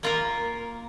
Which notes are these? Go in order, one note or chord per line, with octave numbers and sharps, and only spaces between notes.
A#3 F4 A#4